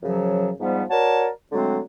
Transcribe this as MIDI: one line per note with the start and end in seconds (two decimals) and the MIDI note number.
0.03 0.50 42
0.03 0.50 49
0.03 0.50 53
0.03 0.50 54
0.59 0.84 44
0.59 0.84 53
0.59 0.84 55
0.59 0.84 59
0.90 1.29 66
0.90 1.29 70
0.90 1.29 73
0.90 1.29 74
0.90 1.29 81
1.52 1.80 50
1.52 1.80 54
1.52 1.80 56
1.52 1.80 57
1.52 1.80 60